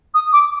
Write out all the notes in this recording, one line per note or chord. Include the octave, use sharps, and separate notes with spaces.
D#6
D6